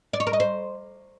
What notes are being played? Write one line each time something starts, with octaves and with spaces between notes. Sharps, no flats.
D5
C#5
A#4
D#5
C5